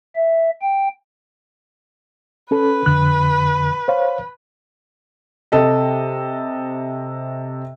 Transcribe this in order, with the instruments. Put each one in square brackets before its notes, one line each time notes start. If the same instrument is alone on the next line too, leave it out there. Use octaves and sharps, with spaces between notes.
[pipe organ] E5
G5
[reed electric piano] C#4 A4 [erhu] B4
[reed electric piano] F2 D3 F#6
C5 C#5 F5
[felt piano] C3 A4 D#5